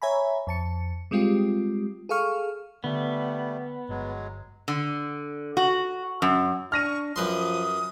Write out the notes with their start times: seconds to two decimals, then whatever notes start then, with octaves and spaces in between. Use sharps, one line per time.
0.02 C#5 E5 G#5 A#5 B5
0.47 F2 A5 C#7
1.11 G3 G#3 C4 F4 G4
2.09 G#4 A4 F5 C#6 F6
2.84 D3 G3 A3 B3
3.89 G1 F#3 G#3
4.68 D3
5.57 F#4
6.22 F#2
6.72 D4 C#6 F6 A#6 D#7
7.16 F#2 F3 B4 C6 D#6